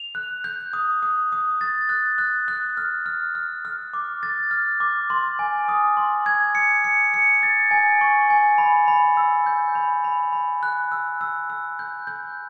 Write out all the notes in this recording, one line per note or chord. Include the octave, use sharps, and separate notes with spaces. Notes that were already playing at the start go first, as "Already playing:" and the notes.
Already playing: F7
F#6
G6
D#6
D#6
D#6
A6
F#6
F#6
F#6
F6
F6
F6
F6
D6
A6
F6
D6
C6
G#5
D#6
C6
G#6
C#7
C#7
C#7
A6
G#5
C#6
G#5
B5
B5
E6
G6
B5
B5
B5
F#6
E6
E6
E6
G6
G6